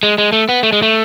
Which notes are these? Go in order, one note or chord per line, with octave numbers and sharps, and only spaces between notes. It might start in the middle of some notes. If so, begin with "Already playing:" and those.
G#3
G#3
A3
B3
A3
G#3
A3